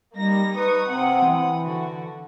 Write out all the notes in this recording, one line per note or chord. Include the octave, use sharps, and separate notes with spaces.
G3 A#3 D#4 A#6
D#4 B4 C#6 D#6
C3 C4 F#5 D#6
E3
D3 F#4